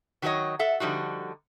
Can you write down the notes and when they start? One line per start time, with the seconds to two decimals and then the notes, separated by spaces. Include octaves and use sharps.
0.22 D#3 F#3 F#4 G4 C#5 D#5
0.59 A4 E5 F#5
0.80 D3 F3 G3 D#4 F#4